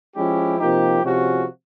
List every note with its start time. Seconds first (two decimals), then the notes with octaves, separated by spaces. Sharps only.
0.16 F3 G#3 C#4 E4 G4
0.58 C3 F3 A#3 D#4 G4
1.02 C3 F3 G#3 C#4 F#4